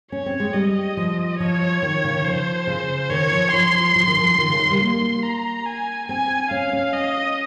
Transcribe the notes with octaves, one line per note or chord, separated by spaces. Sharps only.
C#4 C#5
C4
G#3
G3 D#5
F3
F3 C#5
D#3
C#3
D#3
F3 C5
C#3
D#3 C#5
F3
F3 C6
F3
D#3
F3
D#3
C#3
D#3
G3
A#3 C6
A#5
G#5
C4 G#5
C#4 F5
C#4
D#5